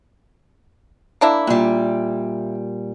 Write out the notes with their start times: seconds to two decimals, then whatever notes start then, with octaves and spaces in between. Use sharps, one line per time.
1.21 A#3 D4 E4
1.47 A#2 G3